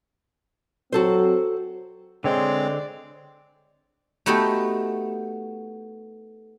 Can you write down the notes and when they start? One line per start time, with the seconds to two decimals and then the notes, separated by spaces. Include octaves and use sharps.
0.92 F#3 C4 F#4 A4 C5
2.24 D3 G#3 C4 C#5 D5 C6
4.26 A3 B3 D#4 F#4 G4 A4